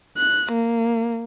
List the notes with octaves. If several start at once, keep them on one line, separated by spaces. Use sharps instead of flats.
F#6
A#3